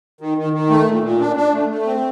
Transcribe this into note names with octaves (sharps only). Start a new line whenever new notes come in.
D#3
D#3
D#3
A3
A#2
A#2
D4
D4
A3
A3
C4